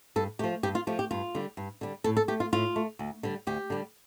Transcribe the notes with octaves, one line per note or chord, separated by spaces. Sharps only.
G2 A4
F3 A3 G4
G2 G4
F4
F3 A3 G4
G4
G2 F4
D3 G3
G2
D3 G3
A2 A4
A4
A3 G4
F4
A2 F4
A3
D2
D3 G3
D2 G4
D3 G3